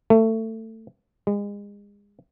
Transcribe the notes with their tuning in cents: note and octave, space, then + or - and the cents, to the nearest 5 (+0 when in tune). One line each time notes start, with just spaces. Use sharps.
A3 +20
G#3 -35